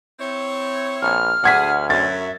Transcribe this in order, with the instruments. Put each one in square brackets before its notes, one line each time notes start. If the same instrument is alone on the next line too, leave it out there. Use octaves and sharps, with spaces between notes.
[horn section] C4 E4 C#5
[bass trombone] A#1 [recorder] F6
[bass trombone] D2 [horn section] D4 G#4 [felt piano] F#5 G#6 B6
[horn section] F#2 [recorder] E5 [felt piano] A6